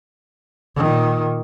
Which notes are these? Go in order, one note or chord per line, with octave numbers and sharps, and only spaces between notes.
A#2 D#3